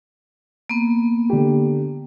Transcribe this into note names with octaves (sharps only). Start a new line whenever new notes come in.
A#3 B3
D3 G4